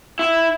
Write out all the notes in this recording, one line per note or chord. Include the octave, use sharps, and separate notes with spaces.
E4